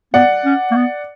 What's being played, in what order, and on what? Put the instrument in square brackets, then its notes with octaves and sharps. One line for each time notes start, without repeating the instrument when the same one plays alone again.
[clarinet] B3 [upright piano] D5 F#5
[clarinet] C#4
A#3
B3